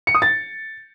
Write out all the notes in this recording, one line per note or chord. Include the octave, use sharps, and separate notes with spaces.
C#7
D#6
A6